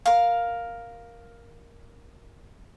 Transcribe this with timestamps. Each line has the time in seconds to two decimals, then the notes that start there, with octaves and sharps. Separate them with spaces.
0.06 A#4 F5